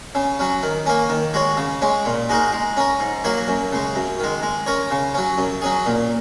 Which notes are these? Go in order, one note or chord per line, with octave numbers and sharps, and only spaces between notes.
C#3
F#3 C#4
D#3
A#3 C#4
D#3
G#3 F#4 C#5
C#3
G#3 C#4
A#2
G#3 D#4 F#4 A#4
G#3
C#4 A#4
G#2
F#3 A#3 F#4 C#5
F#2
C#3 G#3
F#2
D#3 G#3
G#3
C#4 A#4 C#5
C#3
F#3 C#4
F#2
F#3 C#4 G#4
A#2